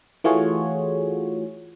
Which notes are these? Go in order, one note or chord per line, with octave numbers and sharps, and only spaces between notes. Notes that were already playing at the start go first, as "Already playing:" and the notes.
E3 A3 F4 F#4 G#4 C#5